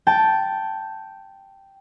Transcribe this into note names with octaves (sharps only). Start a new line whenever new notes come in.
G5 A5